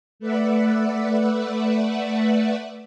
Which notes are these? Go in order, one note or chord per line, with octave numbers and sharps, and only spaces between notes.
A3 B4 D5 E5 F#5